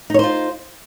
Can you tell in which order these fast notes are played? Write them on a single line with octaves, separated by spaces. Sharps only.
D#4 C#5 C5 F4